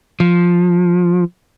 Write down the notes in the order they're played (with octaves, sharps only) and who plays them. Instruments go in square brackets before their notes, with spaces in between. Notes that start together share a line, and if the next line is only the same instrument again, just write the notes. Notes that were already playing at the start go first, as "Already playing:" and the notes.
[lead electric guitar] F3